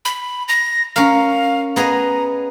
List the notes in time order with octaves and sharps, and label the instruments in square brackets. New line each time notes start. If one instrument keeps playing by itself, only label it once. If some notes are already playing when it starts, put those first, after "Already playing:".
[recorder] B5
A#6
[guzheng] C#4 A#4 [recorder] F5
[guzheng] B3 G#4 D#5 [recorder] A#5